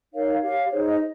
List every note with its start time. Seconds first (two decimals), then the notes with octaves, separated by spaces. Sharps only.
0.13 D#4 A#4 C#5 F5
0.42 G4 C#5 F5
0.71 D#4 G#4 C5 C#5
0.86 D#5